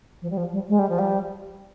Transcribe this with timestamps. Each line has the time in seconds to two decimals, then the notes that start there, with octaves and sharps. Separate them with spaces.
0.22 F3
0.31 G3
0.37 F3
0.53 G3
0.69 G#3
0.79 G3
0.89 F3
0.99 G3